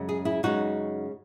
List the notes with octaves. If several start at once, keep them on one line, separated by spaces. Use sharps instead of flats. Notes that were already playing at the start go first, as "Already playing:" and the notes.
Already playing: F#2 C#3 G#3
G#4
E4 G#4
F#2 C#3 G#3 D#4 F#4